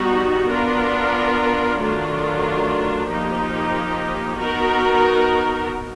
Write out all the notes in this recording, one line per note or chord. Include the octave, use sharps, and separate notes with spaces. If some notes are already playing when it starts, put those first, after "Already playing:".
Already playing: G3 B3 D#4 F#4
B3 D4 F4 A#4
D#3 F#3 A3 D4 F4
F3 A#3 D#4 G4
B3 D#4 F#4 A#4